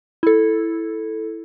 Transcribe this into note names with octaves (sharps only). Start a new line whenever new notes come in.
E4 A4